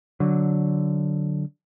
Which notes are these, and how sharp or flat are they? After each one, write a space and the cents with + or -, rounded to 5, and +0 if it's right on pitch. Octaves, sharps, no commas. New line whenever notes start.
D3 +0 F#3 +0